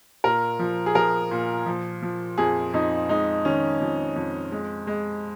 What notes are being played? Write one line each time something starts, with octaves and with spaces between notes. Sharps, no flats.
A#2 A#4
F3
G#4
F3 A#4
A#2
F3
F3
F2 G#4
F2 D#4
G#3 D#4
D#3 C#4
F2
F2
G#3
G#3